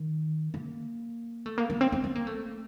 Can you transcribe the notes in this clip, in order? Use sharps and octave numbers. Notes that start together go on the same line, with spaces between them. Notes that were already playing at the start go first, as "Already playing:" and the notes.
Already playing: D#3
A#3
A3
A#3
A#3
C4
C4
C4
A#3
A3